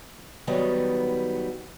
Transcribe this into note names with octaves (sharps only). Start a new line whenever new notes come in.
D#3 F#3 G3 B3